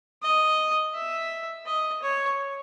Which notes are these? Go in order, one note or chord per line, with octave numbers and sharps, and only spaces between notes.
D#5
E5
D#5
C#5